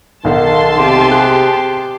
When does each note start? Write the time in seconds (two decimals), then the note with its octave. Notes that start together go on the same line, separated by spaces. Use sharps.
0.25 B1 D#3 D#4 F#5 A5 C6
0.77 C3 G4
1.11 G#4 F#6